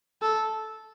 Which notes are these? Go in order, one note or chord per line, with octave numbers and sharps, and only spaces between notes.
A4